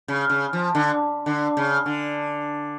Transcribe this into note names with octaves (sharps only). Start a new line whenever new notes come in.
C#3
C#3
F3
D3
D3
C#3
D3